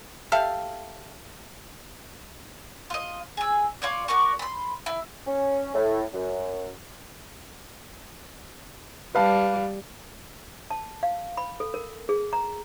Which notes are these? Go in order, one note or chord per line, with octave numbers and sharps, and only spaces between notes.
G4 A4 E5 F5
F4 D#5
G#4 E6
F4 C#5 D5
F#4 A#4 D5 C#6
B5 C6
E4
C#4
A2
F#2
G3 B4 F5 A5
A5
F5
B5
A4
A#4
G#4
A#5